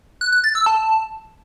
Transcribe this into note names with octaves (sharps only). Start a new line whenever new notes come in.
F#6
F#6
A6
E6
A5